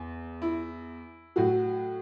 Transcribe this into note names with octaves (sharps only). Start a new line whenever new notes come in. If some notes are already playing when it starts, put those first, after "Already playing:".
Already playing: E2
E4
A2 F#3 F#4